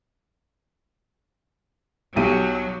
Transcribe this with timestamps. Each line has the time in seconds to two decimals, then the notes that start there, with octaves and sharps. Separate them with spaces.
2.16 B1 F#3 G4 D#7